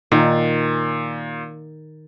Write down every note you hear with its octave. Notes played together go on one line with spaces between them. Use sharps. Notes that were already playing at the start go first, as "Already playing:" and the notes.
A#2 D#3